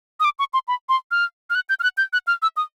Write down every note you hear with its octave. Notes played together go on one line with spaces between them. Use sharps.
D#6
D6
C#6
C6
B5
C6
F6
F6
F#6
G6
F6
F#6
G6
F#6
F6
E6
D#6